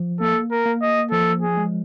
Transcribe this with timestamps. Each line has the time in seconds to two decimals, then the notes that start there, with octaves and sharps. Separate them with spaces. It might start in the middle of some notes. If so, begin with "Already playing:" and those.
Already playing: F3
0.20 A#3 A4
0.51 A#4
0.66 A#3
0.82 D#5
1.11 F3 A4
1.42 G#4
1.57 G#3